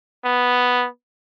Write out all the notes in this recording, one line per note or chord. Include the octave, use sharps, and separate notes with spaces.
B3